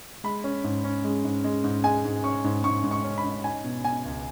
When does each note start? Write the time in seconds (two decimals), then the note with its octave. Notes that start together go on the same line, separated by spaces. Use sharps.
0.24 G#3 B5
0.44 C#4
0.64 G#2
0.84 C#4
1.04 G#3
1.25 G#2
1.44 G#3
1.64 G#2
1.84 G#3 G#5
2.05 G#2
2.24 C#4 C#6
2.44 G#2
2.64 G#2 C#6
2.84 G#2
2.91 C#6
3.04 C#4
3.18 B5
3.24 C#4
3.44 D#4 G#5
3.64 B2
3.84 B2 G#5
4.05 C#2